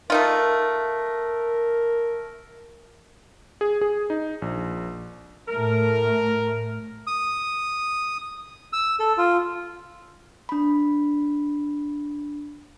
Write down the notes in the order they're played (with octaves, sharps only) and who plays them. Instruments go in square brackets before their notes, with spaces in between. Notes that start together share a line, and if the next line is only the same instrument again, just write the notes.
[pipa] A3 D#4 F4 [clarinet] A#4
[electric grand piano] G#4
G#4
D#4
A#1
[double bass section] A2 A3 [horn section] A#4
[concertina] D#6
E6
A4
F4
[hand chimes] D4 B5